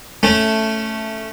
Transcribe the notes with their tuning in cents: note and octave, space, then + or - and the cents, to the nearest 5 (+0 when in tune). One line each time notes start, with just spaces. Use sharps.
A3 +0 C#4 +0